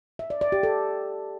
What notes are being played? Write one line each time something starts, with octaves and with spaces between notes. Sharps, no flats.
E5
D5
D5
G4
A4